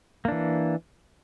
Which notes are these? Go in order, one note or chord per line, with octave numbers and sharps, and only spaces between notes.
E3 A#3 D4